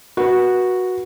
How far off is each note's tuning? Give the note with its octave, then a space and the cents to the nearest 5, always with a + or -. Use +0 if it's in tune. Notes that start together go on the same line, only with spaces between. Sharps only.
F#4 -5 B4 -30